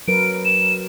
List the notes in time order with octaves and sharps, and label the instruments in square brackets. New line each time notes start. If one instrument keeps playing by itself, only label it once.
[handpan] F#3 A#4 B4 [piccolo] D7
[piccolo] E7